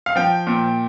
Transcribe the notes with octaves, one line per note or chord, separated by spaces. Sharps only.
F5
F3 G5
A#2